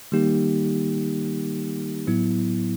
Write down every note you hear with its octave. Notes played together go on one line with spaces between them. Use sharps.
D#3 G3 A#3 D#4 G4
A2 F#3 B3 E4